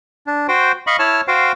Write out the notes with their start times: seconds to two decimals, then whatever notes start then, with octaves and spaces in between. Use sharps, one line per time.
0.27 D4
0.48 F#4 C5 G5
0.87 D#5 F5 B5 C#6
0.99 E4 C#5 A5 F6
1.28 F#4 C5 F5 G5